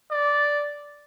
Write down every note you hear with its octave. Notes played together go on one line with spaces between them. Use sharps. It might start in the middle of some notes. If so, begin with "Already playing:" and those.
D5